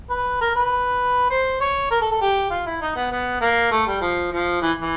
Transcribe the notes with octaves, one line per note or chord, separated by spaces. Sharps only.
B4
A#4
B4
C5
C#5
A#4
A4
A4
G4
F4
E4
D#4
B3
B3
A#3
A3
G3
F3
F3
E3
E3